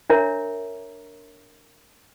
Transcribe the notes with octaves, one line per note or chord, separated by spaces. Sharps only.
D4 A#4 C#5 E5 A#5